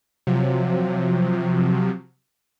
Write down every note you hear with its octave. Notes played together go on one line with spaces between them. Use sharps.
C3 F3 F#3